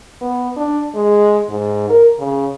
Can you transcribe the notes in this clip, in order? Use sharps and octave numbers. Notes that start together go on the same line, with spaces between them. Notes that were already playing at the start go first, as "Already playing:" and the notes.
B3
D4
G#3
G#2
A#4
C#3